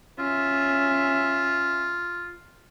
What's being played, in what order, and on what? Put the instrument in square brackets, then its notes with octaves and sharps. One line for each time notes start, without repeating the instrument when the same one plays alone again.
[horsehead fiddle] C#4 E5 [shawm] F4